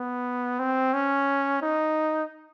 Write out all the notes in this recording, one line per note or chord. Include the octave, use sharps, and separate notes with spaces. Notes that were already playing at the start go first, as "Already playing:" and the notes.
Already playing: B3
C4
C#4
D#4